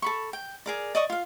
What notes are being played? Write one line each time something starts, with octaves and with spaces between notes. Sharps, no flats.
A4 B5 C#6
G5
G#4 A#4 D5
D5 D#5 C#6 D#6
F4 F5